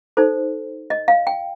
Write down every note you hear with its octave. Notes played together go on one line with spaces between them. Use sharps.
D#4 A4 C5
D#5
F5
G5